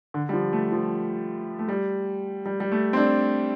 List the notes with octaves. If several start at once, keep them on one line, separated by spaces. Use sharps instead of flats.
D3
G3
F3
A3
F3
A3
G3
G3
G3
A3
C4
D4